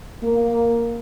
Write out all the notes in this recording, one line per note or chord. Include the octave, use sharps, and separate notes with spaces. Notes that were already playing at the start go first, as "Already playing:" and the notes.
A#3